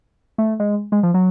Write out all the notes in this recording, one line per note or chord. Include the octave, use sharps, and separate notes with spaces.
A3
G#3
G#3
F3
F#3